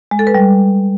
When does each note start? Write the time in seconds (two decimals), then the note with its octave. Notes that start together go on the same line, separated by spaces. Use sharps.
0.11 G#3
0.19 A4
0.27 B4
0.35 G3